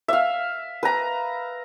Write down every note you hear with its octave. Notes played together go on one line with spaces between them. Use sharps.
E5 F5
B4 A#5